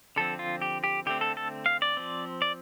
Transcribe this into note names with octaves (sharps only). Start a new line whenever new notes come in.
D3 F3 C4 A4
F4
G4
G4
D3 A3 C4 G4
A4
A4
F5
D5
F3 C4
D5